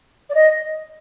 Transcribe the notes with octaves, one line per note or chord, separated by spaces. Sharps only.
D5
D#5